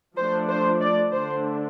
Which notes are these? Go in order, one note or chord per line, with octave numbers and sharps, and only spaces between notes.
F3 A3 D4 C5
C5
D5
D3 A3 D4 C5